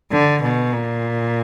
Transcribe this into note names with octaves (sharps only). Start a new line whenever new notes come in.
D3
B2
A#2